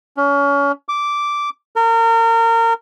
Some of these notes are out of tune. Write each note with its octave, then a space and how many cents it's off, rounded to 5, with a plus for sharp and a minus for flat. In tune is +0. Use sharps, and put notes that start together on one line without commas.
C#4 +30
D6 -5
A#4 -30